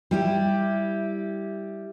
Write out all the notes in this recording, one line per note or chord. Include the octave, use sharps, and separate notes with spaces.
G3 E4 G4